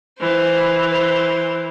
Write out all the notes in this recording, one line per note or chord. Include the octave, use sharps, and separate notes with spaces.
E3 C5
C5